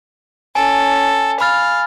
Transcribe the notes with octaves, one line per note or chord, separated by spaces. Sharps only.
C#4 A4 G#5
F5 B5 F6 A6